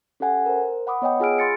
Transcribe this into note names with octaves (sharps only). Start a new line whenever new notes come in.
C#4 G4 A4 F#5 G#5
A#4 C5
F#5 B5 D6 D#6
B3 C#5 D#5 F#5 G5 D#6
F4 G#4 G#5 E6 F6 D7
B5 C6 A6 C#7